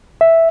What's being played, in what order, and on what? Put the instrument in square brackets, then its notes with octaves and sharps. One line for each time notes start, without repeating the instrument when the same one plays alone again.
[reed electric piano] E5